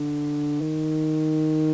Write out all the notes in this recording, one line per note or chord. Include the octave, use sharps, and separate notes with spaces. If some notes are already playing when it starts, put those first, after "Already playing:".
Already playing: D3
D#3